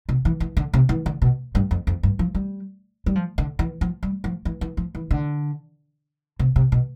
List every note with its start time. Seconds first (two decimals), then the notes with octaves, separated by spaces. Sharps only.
0.09 C3
0.25 E3
0.40 E3
0.57 D3
0.74 C3
0.89 E3
1.06 D3
1.22 B2
1.55 G2
1.71 F2
1.87 F2
2.03 G2
2.19 F3
2.35 G3
3.06 G3
3.15 F3
3.38 D3
3.59 E3
3.81 F3
4.03 G3
4.24 F3
4.45 E3
4.61 E3
4.77 F3
4.95 E3
5.11 D3
6.39 C3
6.56 C3
6.72 B2